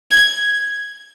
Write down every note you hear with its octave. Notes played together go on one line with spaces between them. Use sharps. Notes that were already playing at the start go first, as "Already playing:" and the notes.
G#6